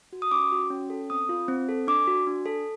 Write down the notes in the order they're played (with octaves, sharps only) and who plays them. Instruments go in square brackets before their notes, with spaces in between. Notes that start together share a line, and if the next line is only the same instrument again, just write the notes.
[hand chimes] F#4
D#6
C#4 D6
F#4
C#4
A4
C4 D#6
F4
C4
A4
D4 D6
F#4
D4
A4